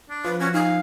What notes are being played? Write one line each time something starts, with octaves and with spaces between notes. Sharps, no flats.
D4
F3 B4
C#4 F#4
D#4 F5 G#5